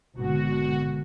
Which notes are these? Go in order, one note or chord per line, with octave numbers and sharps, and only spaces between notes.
G#1 B2 D3 F#4